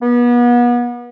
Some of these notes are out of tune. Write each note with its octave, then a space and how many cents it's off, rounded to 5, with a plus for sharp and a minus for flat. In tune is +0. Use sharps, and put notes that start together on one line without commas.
B3 -35